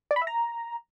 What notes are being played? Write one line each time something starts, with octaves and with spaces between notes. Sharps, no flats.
D5
B5
E5
A#5